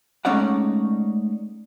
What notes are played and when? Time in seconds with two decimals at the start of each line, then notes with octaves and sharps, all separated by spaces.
0.25 G#3 A3 C#4 D#4 D5 F#5